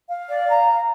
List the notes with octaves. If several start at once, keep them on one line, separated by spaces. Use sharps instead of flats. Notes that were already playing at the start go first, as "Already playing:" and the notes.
F5
D5
A#5